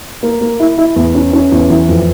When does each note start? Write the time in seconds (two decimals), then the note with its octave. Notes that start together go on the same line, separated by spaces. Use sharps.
0.23 A#3
0.41 A#3
0.60 E4
0.78 E4
0.96 E2
1.15 C#4
1.33 C#4
1.52 E2
1.70 E3
1.88 F2